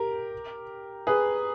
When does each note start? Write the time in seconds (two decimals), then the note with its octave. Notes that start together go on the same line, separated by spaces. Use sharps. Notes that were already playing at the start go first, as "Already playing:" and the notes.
Already playing: G4 A#4
1.07 G#4 B4